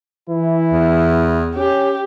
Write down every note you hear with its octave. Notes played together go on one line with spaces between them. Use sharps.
E3 E4
E2
C#4 G4